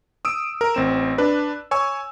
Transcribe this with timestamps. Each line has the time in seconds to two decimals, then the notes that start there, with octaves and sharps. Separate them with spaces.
0.25 D#6 E6 D7
0.61 A#4
0.75 A1 C4 E7
1.18 D4 B4
1.71 C#5 G#5 C#6 E6